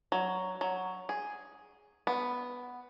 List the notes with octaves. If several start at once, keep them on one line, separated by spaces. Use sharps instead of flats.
F#3
F#3
G#4
B3